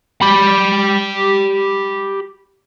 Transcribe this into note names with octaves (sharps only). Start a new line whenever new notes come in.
G4 B5